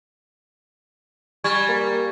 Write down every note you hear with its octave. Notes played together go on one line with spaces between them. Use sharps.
G3 G#5 C#6 G#6
A#3